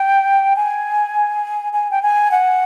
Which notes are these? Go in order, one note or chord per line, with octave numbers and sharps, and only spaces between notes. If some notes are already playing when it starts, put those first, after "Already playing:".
Already playing: G5
G#5
G#5
G5
G#5
F#5